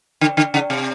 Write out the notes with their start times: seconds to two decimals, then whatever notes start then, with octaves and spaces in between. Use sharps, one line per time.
0.21 D3
0.37 D3
0.54 C#3
0.70 C3